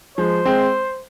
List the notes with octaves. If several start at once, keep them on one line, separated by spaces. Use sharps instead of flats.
F3 G#3 C5
G#3 C4